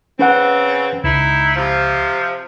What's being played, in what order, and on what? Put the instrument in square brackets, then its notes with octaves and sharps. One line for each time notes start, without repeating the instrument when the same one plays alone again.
[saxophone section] C#3 C4 [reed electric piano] C#4 B4 F#5
[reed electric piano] C#2 [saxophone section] D#4 E4
[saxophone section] C3 F3